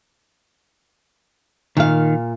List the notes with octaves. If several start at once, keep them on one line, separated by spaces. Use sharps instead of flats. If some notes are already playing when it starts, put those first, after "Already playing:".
A#2 D#3 F5